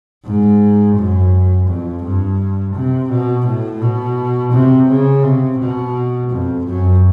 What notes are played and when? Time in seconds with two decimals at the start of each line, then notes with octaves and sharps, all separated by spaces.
0.25 G#2
0.96 F#2
1.68 F2
2.04 G2
2.75 C3
3.10 B2
3.46 A2
3.81 B2
4.52 C3
4.88 C#3
5.23 C3
5.59 B2
6.30 F2
6.65 F#2